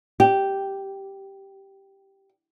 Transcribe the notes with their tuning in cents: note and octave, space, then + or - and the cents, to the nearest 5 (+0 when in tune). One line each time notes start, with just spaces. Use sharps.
G4 -5